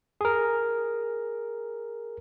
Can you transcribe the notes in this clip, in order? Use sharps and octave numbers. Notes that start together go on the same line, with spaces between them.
G#4 A#4